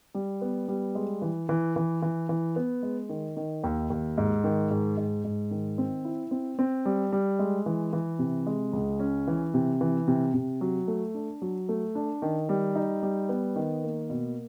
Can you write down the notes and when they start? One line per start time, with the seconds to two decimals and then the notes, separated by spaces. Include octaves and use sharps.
0.15 G3
0.41 B3
0.68 G3
0.95 G#3
1.22 E3
1.49 E3
1.76 E3
2.02 E3
2.29 E3
2.56 B3
2.83 G#3
3.09 D#3
3.37 D#3
3.63 D#2
3.90 D#2
4.18 G#2
4.44 D#3
4.71 G#2
4.98 G#2
5.24 G#2
5.51 D#3
5.78 C4
6.05 E4
6.31 C4
6.59 C4
6.85 G3
7.12 G3
7.39 G#3
7.66 E3
7.93 E3
8.19 C3
8.47 G#3
8.73 C#2
8.99 C#4
9.27 E3
9.54 C3
9.81 E3
10.08 C3
10.34 C3
10.61 F#3
10.88 A3
11.14 D4
11.42 F#3
11.69 A3
11.95 D4
12.22 D#3
12.49 G3
12.75 D#4
13.03 G3
13.29 B3
13.56 D#3
13.83 A#3
14.10 B2